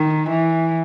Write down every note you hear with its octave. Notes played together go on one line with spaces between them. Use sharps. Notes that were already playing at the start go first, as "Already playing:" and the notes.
Already playing: D#3
E3